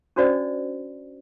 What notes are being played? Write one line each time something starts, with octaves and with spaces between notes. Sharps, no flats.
C#4 D4 F#4 C5 D5 D#5